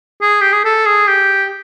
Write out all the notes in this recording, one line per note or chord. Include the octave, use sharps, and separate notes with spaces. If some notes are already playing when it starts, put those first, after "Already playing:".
G#4
G4
G#4
A4
G#4
G4